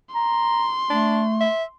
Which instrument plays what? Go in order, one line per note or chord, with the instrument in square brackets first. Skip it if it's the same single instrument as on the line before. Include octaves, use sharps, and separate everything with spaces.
[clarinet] A#5 [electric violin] C6
[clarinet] A3 [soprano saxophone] D4
[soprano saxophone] E5